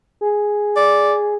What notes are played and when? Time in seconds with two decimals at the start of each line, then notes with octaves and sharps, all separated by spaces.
0.21 G#4
0.76 D5